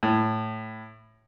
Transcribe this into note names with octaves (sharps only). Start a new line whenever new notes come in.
A2